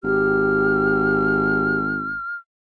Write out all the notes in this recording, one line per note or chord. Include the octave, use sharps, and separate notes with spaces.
G#1 G4 F6